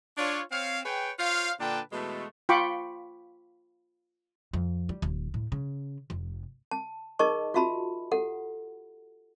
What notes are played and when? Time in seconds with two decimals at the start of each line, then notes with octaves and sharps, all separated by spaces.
0.17 D4 F4 C#5
0.51 C4 C#5 F5
0.85 G#4 B4 C#5 G5
1.19 F4 C5 C#5 F5
1.60 A#2 D3 D4 B4 G5 A5
1.93 B2 E3 G#3 A3
2.49 F4 G5 B5 C#6 D6
4.54 F2
4.89 G3
5.02 D1
5.34 A2
5.52 C#3
6.10 F1
6.71 A5
7.19 D#4 G#4 A#4 D#5 A5 C#6
7.54 F4 F#4 E5 A5 B5
8.11 G4 A4 F#5